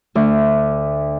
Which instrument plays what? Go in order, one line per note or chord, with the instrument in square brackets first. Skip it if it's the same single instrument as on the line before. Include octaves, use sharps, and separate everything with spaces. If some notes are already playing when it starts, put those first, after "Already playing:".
[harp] D2